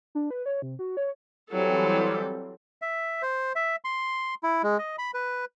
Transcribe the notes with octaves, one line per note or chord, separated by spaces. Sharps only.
D4
B4
C#5
C3
F#4
C#5
E3 F#3 G3 C4 A4
E5
C5
E5
C6
E4
G#3
D#5
B5
B4